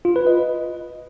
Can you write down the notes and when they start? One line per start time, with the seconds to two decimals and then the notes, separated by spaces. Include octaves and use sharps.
0.05 F4
0.16 B4
0.27 D#5